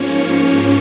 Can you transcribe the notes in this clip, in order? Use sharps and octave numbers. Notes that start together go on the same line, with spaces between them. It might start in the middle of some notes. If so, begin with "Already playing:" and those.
Already playing: G#2 F3 A#3 C#4 C#5
C#5